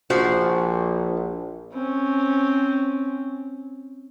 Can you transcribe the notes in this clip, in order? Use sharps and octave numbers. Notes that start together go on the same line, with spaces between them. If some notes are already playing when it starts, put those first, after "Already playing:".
A#1 F3 F#4 C5
C4 C#4